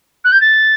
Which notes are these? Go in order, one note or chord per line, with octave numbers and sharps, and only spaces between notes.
F#6
G6
A6